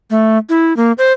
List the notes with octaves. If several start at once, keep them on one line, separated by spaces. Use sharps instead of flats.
A3
E4
A#3
C5